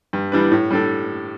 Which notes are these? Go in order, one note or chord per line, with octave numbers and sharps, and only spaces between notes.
G2
E3 G3 D4 B4
A2
G3 D4 A4